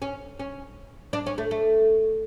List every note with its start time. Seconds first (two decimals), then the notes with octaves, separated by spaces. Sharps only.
0.02 C#4
0.40 C#4
1.13 D4
1.26 C#4
1.38 A3
1.51 A3